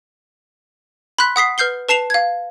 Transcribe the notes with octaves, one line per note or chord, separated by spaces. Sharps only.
B5 C6 F#6 B6
F#5 D#6 B6 C7
B4 F6 G6 C7 G7
B4 A5 C7 E7 F7
F5 G#6